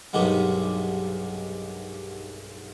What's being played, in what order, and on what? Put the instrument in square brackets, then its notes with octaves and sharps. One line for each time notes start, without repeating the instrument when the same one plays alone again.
[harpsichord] B1 G2 C3 D#3 G#3 B3